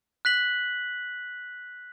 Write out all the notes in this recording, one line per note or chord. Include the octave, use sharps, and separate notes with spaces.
F#6 B6 F#7